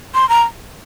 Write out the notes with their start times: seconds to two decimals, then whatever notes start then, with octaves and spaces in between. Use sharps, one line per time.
0.14 C6
0.29 A#5